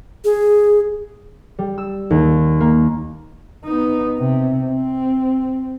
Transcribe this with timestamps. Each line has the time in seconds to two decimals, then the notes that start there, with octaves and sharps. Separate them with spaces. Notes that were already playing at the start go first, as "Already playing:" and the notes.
0.25 G#4
1.58 G3
1.78 E6
2.10 D#2
2.60 A#3
3.65 B3 D#4
4.19 C3
4.70 C4